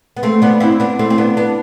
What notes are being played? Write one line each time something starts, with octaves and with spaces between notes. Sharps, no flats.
B3
A3 C4
B3 D4
C4 E4
B3 D4
A3 C4
C4
B3 D4
B3 D4